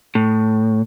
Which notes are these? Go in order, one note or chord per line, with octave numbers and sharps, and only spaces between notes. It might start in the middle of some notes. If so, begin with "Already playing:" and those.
A2